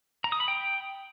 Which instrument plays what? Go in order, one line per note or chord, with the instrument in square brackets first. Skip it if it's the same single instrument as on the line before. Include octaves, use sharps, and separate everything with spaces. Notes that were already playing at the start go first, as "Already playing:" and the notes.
[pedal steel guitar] A#5
D#6
B5
G5